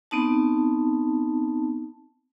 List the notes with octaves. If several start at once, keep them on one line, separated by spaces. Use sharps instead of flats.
B3 C4 D#4 A5